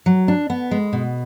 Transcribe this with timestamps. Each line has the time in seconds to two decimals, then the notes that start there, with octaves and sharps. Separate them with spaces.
0.06 F#3
0.28 D4
0.50 B3
0.71 G#3
0.93 B2